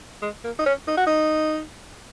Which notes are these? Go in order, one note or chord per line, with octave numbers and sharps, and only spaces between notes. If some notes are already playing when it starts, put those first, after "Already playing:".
G#3
A#3
D#4
C#4
D#4
F#4
D#4